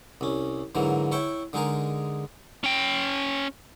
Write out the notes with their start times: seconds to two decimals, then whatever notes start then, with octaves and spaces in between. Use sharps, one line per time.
0.21 C2 C#4
0.75 G#2 D3 E3 F#3 A#3
1.12 E4 C#5 E5 G5
1.53 D3 G#3 D#4 G#4 A#4
2.64 C#4 G5